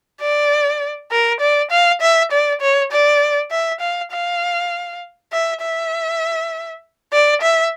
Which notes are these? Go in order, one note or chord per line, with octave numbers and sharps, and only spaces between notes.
D5
A#4
D5
F5
E5
D5
C#5
D5
E5
F5
F5
E5
E5
D5
E5